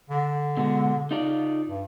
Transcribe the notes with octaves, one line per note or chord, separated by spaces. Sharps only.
D3
B2 G#3 F#4
C#3 D#4 F4 D5
G2